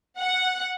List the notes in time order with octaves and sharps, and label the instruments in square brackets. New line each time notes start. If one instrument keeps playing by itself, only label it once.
[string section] F#5